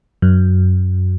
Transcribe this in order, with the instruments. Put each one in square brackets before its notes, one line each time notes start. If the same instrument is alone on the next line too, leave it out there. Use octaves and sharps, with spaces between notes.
[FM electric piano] F#2